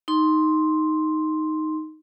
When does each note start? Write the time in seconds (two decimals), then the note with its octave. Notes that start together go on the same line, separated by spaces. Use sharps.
0.08 D#4 C6